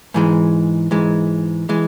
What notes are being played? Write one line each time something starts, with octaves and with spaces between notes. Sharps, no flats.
G#2 E3 G#3
G#2 E3 G#3
E3 G#3